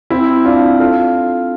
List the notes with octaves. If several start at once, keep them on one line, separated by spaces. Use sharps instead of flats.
C4 E4
D4 F4
F4 A4